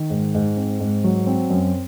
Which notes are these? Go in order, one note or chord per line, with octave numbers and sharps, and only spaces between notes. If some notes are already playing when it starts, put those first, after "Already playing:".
Already playing: D#3
G#2
G#2
C4
G#2
F#3
C4
F#2